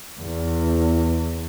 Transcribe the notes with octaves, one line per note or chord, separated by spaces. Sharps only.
E2